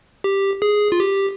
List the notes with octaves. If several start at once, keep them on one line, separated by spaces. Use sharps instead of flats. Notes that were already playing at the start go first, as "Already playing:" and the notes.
G4
G#4
F4
G4